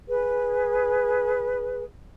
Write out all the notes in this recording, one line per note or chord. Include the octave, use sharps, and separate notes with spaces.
G#4 B4